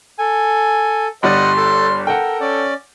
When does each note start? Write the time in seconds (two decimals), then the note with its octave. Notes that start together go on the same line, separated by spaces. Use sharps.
0.19 A4 G#5
1.23 G1 G3 D5 D#5 F#5 C6
1.57 A4 A5
2.07 A4 A#4 F#5 G5
2.41 C#4 D5